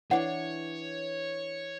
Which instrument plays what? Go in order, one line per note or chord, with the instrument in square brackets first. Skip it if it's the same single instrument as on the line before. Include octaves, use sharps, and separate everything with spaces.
[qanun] E3 D4 [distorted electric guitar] C#5 [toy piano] F#5